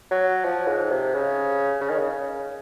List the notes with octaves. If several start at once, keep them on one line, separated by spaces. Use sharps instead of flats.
F#3
F3
G#2
C3
C#3
C#3
D#3
C#3